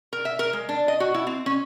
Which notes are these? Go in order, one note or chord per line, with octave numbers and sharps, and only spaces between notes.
A#4
E5
A#4
G#3
D4
D#5
F#4
E4
C4
C#4